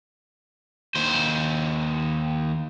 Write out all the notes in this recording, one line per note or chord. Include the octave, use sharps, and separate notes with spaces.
D#2 C5